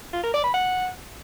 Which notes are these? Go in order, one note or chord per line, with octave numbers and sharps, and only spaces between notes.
F4
A#4
D5
B5
F#5